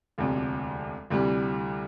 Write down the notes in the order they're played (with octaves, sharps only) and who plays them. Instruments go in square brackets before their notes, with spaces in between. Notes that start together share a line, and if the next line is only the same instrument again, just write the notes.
[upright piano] E1 D2 C3 F3
D2 C3 E3 G3